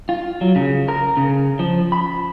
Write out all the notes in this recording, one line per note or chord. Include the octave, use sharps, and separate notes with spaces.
F4
F#3
C#3
A#4
C#3
F3
B5